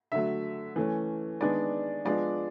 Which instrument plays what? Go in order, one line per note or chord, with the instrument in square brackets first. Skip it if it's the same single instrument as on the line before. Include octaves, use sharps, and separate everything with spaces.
[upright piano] D3 F#3 A3 E5
E3 A3 C#4
D#3 G#3 B3 D4 D5
F3 G#3 B3 D4 D5